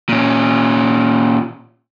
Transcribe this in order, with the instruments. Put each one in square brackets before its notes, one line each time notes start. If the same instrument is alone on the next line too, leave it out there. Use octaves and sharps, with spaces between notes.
[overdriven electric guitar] A#2 C#4